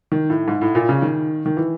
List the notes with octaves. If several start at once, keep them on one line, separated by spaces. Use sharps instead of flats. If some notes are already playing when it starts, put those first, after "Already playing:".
D#3
A2
G#2
A2
A#2
C#3
D#3
D#3
E3